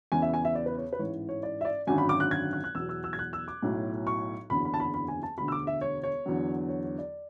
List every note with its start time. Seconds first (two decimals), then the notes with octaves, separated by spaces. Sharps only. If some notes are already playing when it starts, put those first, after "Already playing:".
0.12 E2 C#3 E3 G#5
0.22 E5
0.34 G#5
0.45 E5
0.55 D5
0.66 B4
0.78 C#5
0.93 B4
0.99 A1 G#2 E3 C#5
1.29 C#5
1.43 D5
1.61 E5
1.65 D5
1.87 G#1 F#2 D3 F#3 G#5
1.98 B5
2.09 D6
2.20 F#6
2.31 G#6
2.53 F#6
2.64 F#6
2.75 E2 B2 F#3 E6
2.89 E6
3.04 E6
3.13 G#6
3.19 F#6
3.33 E6
3.48 D6
3.62 B1 A2 F#3
4.07 C#6
4.50 F#1 E2 D3 F#3 B5
4.65 B5
4.74 A5
4.80 B5
4.94 B5
5.08 G#5
5.23 A5
5.38 E1 D2 D3 B5
5.48 E6
5.52 D6
5.67 E5
5.81 C#5
6.03 C#5
6.26 E2 D3 F#3
6.69 C#5
6.84 C#5
6.98 D5